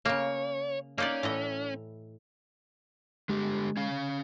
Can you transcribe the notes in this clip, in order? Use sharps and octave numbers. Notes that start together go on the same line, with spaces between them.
C#3 A#3 C#5
A#3 C#4 D#4 D5
A2 E3 D#5
D3 G#3 G4
C#4 F5